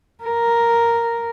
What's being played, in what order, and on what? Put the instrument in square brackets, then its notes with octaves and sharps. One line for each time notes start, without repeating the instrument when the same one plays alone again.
[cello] A#4